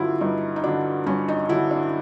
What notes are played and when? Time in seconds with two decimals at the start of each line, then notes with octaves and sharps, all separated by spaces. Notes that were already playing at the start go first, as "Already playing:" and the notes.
Already playing: G2 D3 F#3 E4 F4
0.21 G2 D#4
0.56 D#4
0.64 D3 F#3 D4
1.06 G2 C#4
1.28 D#4
1.49 D3 F#3 E4
1.71 D4